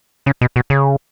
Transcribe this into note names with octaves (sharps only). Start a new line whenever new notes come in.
C#3
B2
B2
C#3